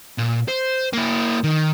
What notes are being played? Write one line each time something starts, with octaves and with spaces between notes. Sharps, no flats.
A#2
C5
A#3 E4
D#3